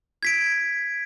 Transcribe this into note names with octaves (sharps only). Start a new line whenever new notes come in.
G#6 B6 D7